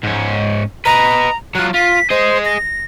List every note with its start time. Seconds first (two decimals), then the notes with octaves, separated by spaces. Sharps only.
0.04 G#2 C#4
0.85 B4 D#5 A#5
1.55 F#3 F4 F#6
1.74 F4 B6
2.10 G#4 C5 D#5
2.45 A#6